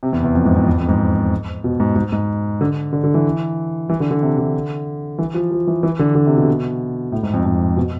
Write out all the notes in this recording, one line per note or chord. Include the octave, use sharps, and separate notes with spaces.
C3
E2
E2
F2
G#2
F2
E2
F2
G#2
B2
G#2
G#2
G#2
D3
D3
D3
E3
E3
D3
D3
C3
D3
E3
F3
F3
E3
E3
D3
D3
C3
B2
A2
G#2
F2
F2
B2